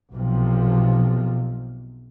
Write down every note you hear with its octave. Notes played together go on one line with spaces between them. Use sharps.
B1 C3 F3